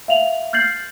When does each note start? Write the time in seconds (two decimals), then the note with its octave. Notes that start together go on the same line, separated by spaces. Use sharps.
0.08 E5 F5 F7 F#7
0.53 F6 G6 A6 C7 F#7